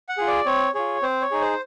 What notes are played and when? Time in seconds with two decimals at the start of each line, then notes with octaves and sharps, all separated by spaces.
0.09 F#5
0.17 F4 G#4
0.27 D5
0.46 C4 C#5
0.74 F4 G#4 C#5
1.02 C4 C5
1.22 C#5
1.31 D#4 G#4
1.41 C5